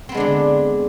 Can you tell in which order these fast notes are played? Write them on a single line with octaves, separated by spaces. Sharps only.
C4 B3 G#3 D4 D3